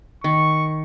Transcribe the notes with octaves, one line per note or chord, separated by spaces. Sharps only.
D#3 C#6